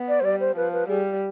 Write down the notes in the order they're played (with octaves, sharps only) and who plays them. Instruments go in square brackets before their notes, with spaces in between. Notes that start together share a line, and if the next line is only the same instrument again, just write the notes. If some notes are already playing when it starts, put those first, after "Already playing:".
Already playing: [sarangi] B3
[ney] D5
C5
[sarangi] G3 [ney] D5
[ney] C5
[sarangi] F3 [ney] B4
[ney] B4
[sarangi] G3 [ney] G#4